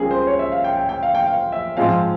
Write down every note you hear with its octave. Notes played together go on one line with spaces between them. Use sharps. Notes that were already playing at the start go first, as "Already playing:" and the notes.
Already playing: C#2 C#3 G3 C4 G#4 A#4
C5
C#5
E5
F5
G5
G5
G5
F5
G5
F5
E5
G#2 F3 G#3 C4 F5